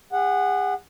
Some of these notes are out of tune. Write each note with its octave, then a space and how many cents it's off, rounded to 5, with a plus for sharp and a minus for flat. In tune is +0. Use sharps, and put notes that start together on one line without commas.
G#4 -40 F#5 +0